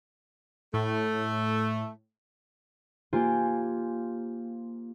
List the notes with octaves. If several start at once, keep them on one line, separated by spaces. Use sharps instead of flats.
A2 A3
A#3 F4 G4 C5 G#5